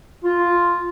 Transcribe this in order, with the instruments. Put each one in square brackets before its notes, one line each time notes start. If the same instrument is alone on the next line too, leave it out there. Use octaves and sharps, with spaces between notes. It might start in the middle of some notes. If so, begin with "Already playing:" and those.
[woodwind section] F4